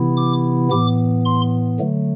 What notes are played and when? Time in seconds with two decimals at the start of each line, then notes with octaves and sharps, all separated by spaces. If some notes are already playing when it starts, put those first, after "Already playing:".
Already playing: C3 E3 B3 E4
0.17 D6
0.71 A2 E3 B3 D6
1.25 C6
1.79 D3 F#3 A3